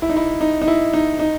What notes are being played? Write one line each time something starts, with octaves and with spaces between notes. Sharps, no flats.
E4
D#4
E4
D#4
D#4
E4
D#4
D#4